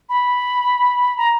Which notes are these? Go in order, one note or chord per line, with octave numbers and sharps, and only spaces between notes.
B5
A#5